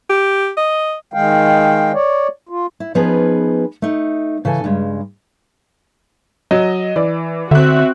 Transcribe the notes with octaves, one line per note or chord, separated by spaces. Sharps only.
G4
D#5
D#3 G#3 F5 G5
C#5 D5
F4
E4
F3 B3 C#4 D#4 G#4 B4
A3 D#4
C#3 E3 A4 G#5
G2 C#3 G#3
F#3 D#5
E3 D5
D3 C4 F#4 E5 F#6